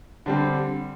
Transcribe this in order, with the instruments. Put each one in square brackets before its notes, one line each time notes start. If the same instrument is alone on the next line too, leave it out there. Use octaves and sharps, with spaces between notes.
[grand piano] D3 G3 C4